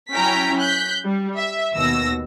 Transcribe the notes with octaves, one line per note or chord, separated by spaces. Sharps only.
F#3 C#4 E4 G5 A#5 B6
F#6 G6 B6
G3
E5
D#2 B2 E6 A#6